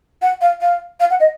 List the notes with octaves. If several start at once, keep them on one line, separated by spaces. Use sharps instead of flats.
F#5
F5
F5
F5
F#5
D#5